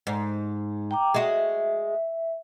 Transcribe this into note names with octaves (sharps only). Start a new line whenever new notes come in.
G#2
G5 A#5 D6
G#3 F#4 E5